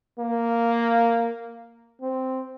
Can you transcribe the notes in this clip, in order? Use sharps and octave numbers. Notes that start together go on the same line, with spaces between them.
A#3
C4